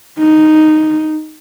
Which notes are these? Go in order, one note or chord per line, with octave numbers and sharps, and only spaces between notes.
D#4